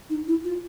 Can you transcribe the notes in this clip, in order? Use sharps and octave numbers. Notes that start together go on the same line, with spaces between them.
D#4
E4
F4